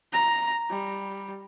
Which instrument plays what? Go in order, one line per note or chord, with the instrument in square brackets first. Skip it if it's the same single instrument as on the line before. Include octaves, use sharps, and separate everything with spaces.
[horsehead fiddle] A#5
G3